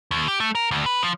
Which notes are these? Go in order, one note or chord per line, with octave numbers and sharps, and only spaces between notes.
D#2
G4
A3
A#4
D2
B4
F3